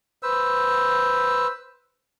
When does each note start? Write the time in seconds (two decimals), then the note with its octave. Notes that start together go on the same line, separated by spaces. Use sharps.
0.23 B4 C5 E6